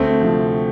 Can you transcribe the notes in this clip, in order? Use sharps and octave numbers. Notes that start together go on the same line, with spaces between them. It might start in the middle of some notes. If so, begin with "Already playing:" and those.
Already playing: D2 A3 C4
C3 F3